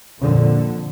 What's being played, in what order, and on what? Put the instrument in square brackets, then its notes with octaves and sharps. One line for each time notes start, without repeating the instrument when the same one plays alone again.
[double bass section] F2 A#2 D3